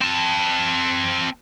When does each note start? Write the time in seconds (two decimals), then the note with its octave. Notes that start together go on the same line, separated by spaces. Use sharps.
0.02 C4 A5